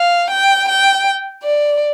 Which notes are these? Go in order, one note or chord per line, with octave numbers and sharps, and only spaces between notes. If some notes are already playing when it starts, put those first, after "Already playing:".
Already playing: F5
G5
G5
D5